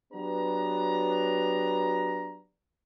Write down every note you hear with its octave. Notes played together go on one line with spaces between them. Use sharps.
F#3 B3 D4 G4 B4 A#5